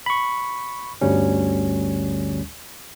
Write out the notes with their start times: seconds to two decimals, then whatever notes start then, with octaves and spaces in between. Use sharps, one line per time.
0.06 B5 C#6
1.01 G1 D2 G3 C#4